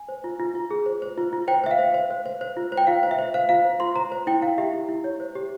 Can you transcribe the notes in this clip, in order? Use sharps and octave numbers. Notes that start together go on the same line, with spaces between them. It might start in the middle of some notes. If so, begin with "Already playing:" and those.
Already playing: G#5
C5
F4
F4
F4
G#4
C5
C5
F4
F4
C5 G5
C5 E5
F5
C5
C5
C5
C5
C5
F4
C5
G5
F4 F5
C5
E5
C5
C5 F5
F4 F5
C5
F4 C6
C5 A#5
C5
E4 G5
E4 F5
G4 E5
E4
E4
C#5
C5
G4